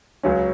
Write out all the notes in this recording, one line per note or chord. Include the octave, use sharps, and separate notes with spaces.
C#2 C#3 F#3 C#4